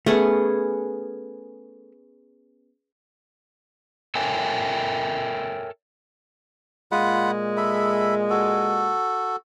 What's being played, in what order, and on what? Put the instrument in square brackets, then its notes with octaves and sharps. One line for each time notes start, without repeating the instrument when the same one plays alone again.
[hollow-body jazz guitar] A3 [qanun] B3 C#4 G#4
[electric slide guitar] A4 A#4 C#5 E5 G5 G#5
[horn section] A#2 G#3 [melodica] F4 F#5 B5
[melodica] A4 E5 B5
F#4 A4